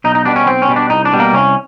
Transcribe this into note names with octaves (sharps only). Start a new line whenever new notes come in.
B1 D#4
D#4
B2 G3 D4
C#4
B1 C4
C#4
B2 G3
D4
C2 D#4
D4
B2 G3
A#3
C2 C#4